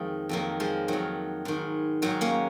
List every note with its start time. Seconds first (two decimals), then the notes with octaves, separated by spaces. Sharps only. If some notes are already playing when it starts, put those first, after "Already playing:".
Already playing: F2 D#3 F3 G#3
0.29 F2 D#3 F#3 A#3
0.60 F3 G#3
0.88 F2 D#3 F#3
1.45 G#2 D#3
2.02 G#2 D#3 F#3
2.21 A#3 C#4